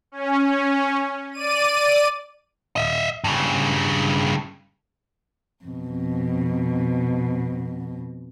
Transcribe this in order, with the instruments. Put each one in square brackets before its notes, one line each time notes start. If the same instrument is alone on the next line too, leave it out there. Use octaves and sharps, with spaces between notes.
[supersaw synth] C#4
D5 D#7
[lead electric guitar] D#5 E5
G2 C#3
[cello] F2 B2